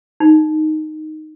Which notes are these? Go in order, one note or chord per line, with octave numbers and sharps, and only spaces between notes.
D#4